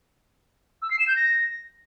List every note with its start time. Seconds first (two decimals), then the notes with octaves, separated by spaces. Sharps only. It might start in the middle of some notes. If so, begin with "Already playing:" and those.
0.82 E6
0.91 C7
0.99 E7
1.08 G6
1.16 A#6